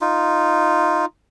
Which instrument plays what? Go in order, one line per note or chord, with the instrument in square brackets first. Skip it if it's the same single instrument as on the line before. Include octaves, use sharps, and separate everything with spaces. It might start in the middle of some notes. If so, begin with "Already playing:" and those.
[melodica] D#4 F4